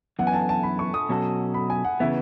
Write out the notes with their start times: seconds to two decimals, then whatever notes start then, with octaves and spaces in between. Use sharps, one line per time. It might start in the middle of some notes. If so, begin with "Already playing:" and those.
0.19 F#2 E3 B3 F#5
0.27 G#5
0.34 A5
0.49 A5
0.63 B5
0.79 C#6
0.94 D#6
1.09 B2 F#3 C#4 F#4 A4
1.54 B5
1.70 G#5
1.85 F#5
2.00 C#3 E3 B3 E5